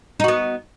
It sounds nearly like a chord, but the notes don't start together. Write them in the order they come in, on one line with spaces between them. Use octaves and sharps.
D#4 F#4 B3